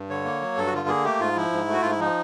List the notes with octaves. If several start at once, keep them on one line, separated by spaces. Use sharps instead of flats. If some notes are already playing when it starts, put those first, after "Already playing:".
Already playing: G2
D3 C#5
A#3
F#3
G2 A4
F#4
D3 F4
A#3 G#4
A3 G4
G#2 F4
F3 E4
G#2
A3 F#4
G#2 F4
E4
F3 D#4